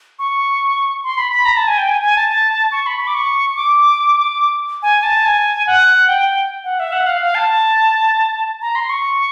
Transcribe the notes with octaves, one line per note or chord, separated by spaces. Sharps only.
C#6
C6
B5
B5
A#5
A5
G#5
G5
G#5
G#5
A5
C#6
B5
B5
D6
C#6
C#6
D6
G#5
A5
G#5
F#5
G5
F#5
E5
F#5
F5
F5
A5
A#5
C6
C#6